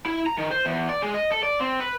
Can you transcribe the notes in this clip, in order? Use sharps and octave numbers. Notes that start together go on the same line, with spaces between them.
E4
A#5
D#3
C5
E2
D5
G#3
D#5
A4
D5
C4
B4